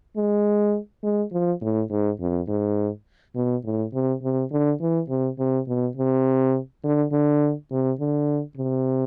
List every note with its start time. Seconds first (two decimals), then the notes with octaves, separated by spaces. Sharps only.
0.17 G#3
1.03 G#3
1.32 F3
1.62 A2
1.90 G#2
2.20 F2
2.48 G#2
3.35 B2
3.64 A2
3.93 C3
4.23 C3
4.52 D3
4.81 E3
5.09 C3
5.39 C3
5.68 B2
5.97 C3
6.84 D3
7.12 D3
7.71 C3
8.00 D3
8.57 C3